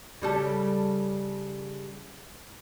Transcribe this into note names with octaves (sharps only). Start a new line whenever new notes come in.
C#3 G3 A4